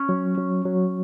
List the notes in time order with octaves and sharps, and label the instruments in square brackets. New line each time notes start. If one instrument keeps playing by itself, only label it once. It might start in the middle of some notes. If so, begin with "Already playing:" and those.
Already playing: [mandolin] C#4
[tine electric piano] F#3
F#3
F#3